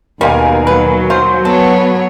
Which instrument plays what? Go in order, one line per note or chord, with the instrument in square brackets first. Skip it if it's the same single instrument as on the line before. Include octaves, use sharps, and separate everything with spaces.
[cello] D#2 B2 [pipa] G3 G#3 [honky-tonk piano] A#4 F5 G#5
[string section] F#3 [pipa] B4
[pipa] F4 C5
[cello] B3 C#5 [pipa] A4